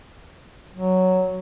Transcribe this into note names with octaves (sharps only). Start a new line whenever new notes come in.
F#3